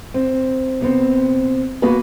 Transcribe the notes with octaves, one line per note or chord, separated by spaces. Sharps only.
C4
C3 B3 C4
A#3 B3 F#4 B4